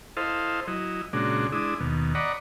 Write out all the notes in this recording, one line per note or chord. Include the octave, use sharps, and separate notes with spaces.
E4 A4 C5 D#5 F5
F#3 E4 D#5
A#2 C#3 G#3 D4 F#4
G#3 D4 E4 D#6
D#2 B2
D5 D#5 F#5 A#5 B5 C#6